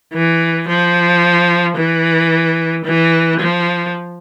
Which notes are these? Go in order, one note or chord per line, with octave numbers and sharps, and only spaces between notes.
E3
F3
E3
E3
F3